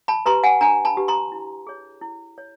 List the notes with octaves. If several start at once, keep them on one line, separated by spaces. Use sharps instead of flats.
A5 B5
G4 B4 A#5 C6
F#5 G#5
D4 G#5 A#5
A5 B5
G4 B4
A#5 C6
E4
G#4 C#5
E4
C#5